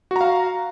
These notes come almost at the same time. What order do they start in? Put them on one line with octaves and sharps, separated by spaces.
F#4 A#5 F5